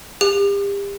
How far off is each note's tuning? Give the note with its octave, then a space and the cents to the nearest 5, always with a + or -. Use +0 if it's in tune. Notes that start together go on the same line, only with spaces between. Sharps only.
G4 +35